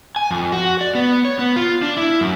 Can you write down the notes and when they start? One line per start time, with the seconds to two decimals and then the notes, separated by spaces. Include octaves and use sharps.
0.16 G#5
0.31 F2
0.52 F#4
0.81 D5
0.95 B3
1.25 C#5
1.39 B3
1.56 F4
1.82 D4
1.97 E4
2.21 F#2